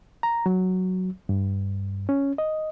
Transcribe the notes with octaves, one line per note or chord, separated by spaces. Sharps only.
A#5
F#3
G2
C#4
D#5